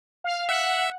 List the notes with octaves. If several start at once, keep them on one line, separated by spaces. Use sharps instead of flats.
F5
E5 F#5